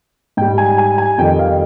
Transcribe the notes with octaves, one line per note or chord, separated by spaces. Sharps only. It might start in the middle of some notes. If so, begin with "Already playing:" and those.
G#2 G3 G5
G#5
G#5
G#5
F2 D#3 G3 G5
F5